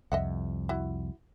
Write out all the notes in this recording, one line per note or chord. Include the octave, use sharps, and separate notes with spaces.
C2 F2 D#5 E5 F#5
E4 F#4